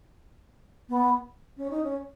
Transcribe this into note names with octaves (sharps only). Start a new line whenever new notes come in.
B3
C#4
D#4
C#4